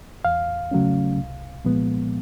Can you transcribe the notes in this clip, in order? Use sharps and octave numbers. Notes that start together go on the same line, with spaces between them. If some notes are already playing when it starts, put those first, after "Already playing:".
E2 F5
C#3 F#3 A3 C#4
C2
A#2 F3 G#3 B3